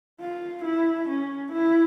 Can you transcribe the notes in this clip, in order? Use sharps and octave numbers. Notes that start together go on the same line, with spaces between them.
F4
E4
C#4
E4